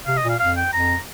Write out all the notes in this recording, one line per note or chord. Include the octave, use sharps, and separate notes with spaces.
C3 F5
D#5
A#2
F5
F2 F5
G5
F2 A#5